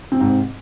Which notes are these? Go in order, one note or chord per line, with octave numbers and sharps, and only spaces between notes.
G#2 C3 C4